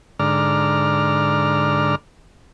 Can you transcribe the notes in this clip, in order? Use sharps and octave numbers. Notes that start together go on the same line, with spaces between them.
G#2 D3 D5 A#5 F6